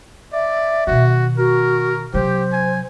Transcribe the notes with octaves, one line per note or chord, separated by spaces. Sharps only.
D5 E5
B2 D#3 F#4
F#4 A#4
C3 F#3 G4 C5
G#5